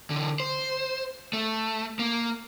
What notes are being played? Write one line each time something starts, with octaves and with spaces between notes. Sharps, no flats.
D3 E3
C5
A3
A#3